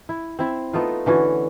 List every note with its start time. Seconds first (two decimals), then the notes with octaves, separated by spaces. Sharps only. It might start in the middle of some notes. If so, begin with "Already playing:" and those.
0.09 E4
0.39 C4 E4 E5
0.73 A3 B3 D#4 F4
1.06 D3 E3 C#4 F#4